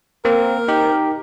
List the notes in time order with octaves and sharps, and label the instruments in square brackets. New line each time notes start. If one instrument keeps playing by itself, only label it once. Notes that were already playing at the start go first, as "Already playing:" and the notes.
[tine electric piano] A#3 C4 [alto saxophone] A#4
[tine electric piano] D#4 G4